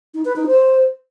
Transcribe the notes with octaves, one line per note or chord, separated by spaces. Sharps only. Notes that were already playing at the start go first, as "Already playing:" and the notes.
D#4
B4
D#4
C5